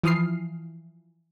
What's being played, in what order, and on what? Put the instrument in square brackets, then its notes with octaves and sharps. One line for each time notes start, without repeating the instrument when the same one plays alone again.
[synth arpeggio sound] E3 F3 D#6 F6 C7